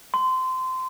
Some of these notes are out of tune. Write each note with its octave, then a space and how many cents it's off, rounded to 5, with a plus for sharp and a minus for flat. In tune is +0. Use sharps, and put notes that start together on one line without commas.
C6 -20